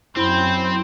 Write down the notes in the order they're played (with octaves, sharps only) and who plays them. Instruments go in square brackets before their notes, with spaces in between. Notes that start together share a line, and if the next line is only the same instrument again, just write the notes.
[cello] F#2 [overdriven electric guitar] C4 [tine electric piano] E4 B5 [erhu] C5